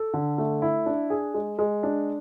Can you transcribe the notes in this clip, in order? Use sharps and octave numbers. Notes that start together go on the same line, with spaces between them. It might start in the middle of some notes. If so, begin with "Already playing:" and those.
Already playing: A4
D3
A3
E4
D4
G#4
G#3
G#3
D4